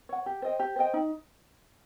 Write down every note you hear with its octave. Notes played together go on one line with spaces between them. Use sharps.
C#5 F#5
G4
C5 D#5 G5
G4
C5 D#5 G5
D#4